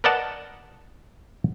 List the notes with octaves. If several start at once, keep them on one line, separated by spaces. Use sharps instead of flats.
A#4 B4 D5 D#5 F#5 A5